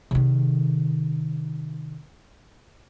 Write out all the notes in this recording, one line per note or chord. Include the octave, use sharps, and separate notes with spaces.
C3 D#3